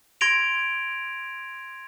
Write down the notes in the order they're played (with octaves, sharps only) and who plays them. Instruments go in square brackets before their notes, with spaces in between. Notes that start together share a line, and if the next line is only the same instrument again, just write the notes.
[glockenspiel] C6 G#6 A#6 D7 F7